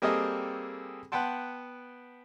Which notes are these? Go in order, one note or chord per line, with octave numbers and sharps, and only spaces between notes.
G3 A#3 C4 G#4 A4 D#5
B3 F#5 G5 A5 C6